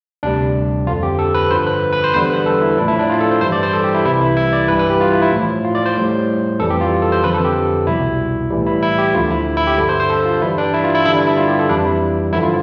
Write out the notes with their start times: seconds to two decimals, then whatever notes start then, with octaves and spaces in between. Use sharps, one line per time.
0.23 D2 C3 G3 D4
0.87 F2 D3 F3 F4
1.03 G4
1.19 A4
1.34 B4
1.50 G2 D3 F3 C5
1.67 B4
1.93 B4
2.04 C5
2.14 E2 D3 G3 C5
2.30 B4
2.46 A4
2.62 E4
2.77 F3 D4
2.81 A2
2.88 E4
2.99 D4
3.09 F4
3.20 A4
3.31 C5
3.41 G2 E3 G3 C5
3.52 D5
3.63 C5
3.73 A4
3.84 G4
3.94 E4
4.05 C2 C3 E3 E4
4.21 E4
4.37 E4
4.53 D5
4.68 G2 E3 G3 B4
4.79 B4
4.90 G4
5.01 F4
5.11 E4
5.22 E4
5.32 A2 F3
5.64 F4
5.75 D5
5.86 C5
5.97 A2 G3
6.60 F2 E3 G3 A4
6.70 G4
6.81 F4
7.02 A4
7.12 C5
7.23 F2 D3 F3 B4
7.34 A4
7.44 G4
7.87 C2 B2 G3 E4
8.50 A2 E3 G3
8.66 E4
8.82 E4
8.98 G4
9.14 D2 D3 F3 F4
9.30 E4
9.57 E4
9.67 G4
9.78 G2 D3 G3 A4
9.89 C5
10.00 C5
10.10 A4
10.26 F4
10.41 G2 E3 G3 E4
10.58 D4
10.74 E4
10.84 F4
10.95 E4
11.05 G2 D3 G3 E4
11.16 D4
11.27 E4
11.37 F4
11.48 G4
11.59 A4
11.69 F2 E3 G3 D4
11.85 E4
12.32 G2 D3 F3 E4
12.43 F4